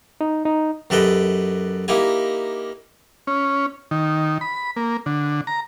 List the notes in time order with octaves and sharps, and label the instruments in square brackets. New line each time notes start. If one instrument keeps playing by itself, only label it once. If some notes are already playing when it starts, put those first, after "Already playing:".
[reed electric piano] D#4
D#4
[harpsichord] F#2 G4 A4 B4 D#5 G5
A#3 D#4 E4 G4 G#5
[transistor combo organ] C#4
D#3
B5
A#3
D3
A#5